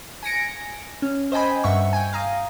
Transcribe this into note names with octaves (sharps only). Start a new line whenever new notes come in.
G#5 A#6 C#7 D7
C#4
C5 D#5 G5 G#5 B5
G2 E5 F#5 C#6
G5 G#5
F5 A#5 D#6